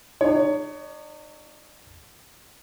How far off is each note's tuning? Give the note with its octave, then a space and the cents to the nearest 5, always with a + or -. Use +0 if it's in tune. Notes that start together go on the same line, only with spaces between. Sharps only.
D#4 -40 C#5 +20